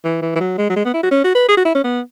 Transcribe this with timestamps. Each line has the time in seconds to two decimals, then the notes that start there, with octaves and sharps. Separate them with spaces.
0.04 E3
0.22 E3
0.35 E3
0.40 F#3
0.58 G#3
0.70 F#3
0.76 G#3
0.85 B3
0.94 E4
1.03 F#4
1.11 C#4
1.24 F#4
1.35 B4
1.48 G#4
1.57 F#4
1.65 E4
1.75 C#4
1.84 B3